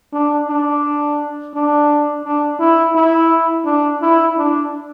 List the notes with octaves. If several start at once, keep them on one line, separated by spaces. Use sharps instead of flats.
D4
D4
D4
D4
E4
E4
D4
E4
D4